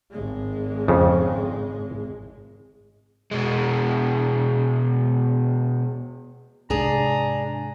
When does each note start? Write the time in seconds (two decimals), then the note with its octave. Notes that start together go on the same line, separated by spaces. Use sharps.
0.11 G#1 G#3
0.88 F2 C#3
3.31 B2 G#3
6.70 G#2 C3 D4 G#4 A#5